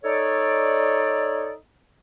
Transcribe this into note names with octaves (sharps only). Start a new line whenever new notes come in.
D#4 A4 C#5 D5